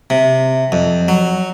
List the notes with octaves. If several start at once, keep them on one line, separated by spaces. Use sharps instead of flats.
C3
F2
F#3